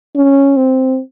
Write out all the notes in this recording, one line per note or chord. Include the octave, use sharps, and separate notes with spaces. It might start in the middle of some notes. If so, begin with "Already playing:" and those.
C#4
C4